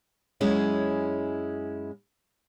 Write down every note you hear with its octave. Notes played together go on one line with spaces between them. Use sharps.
F#2 G#3 C#4 E4